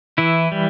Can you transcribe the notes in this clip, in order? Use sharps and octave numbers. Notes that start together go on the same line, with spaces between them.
E3 E4
G3